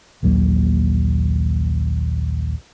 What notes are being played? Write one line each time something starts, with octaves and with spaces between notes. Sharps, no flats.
A#1 D#2 F#3 A#3